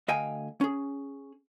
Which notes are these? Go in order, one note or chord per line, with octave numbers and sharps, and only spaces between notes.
D2 D#5 F5 G5 G#5
C#4 G#4